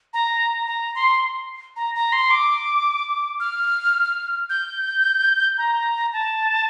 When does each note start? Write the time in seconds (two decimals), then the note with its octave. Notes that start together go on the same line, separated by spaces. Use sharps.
0.14 A#5
0.67 A#5
0.95 C6
1.76 A#5
1.95 A#5
2.12 C6
2.31 D6
3.40 F6
4.49 G6
5.58 A#5
6.13 A5